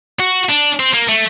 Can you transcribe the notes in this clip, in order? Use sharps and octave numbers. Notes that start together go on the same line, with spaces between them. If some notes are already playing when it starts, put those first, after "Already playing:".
F#4
D4
C4
A#3
A3